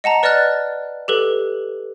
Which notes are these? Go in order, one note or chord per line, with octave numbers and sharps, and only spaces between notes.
D#5 F#5 A5 A#5
B4 D5 D#5 F6 F#6 A6
G4 A4 B4